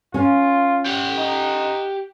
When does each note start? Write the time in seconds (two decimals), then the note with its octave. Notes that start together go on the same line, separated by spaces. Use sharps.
0.14 C#4 F4
0.86 G4 F#5
1.18 D#4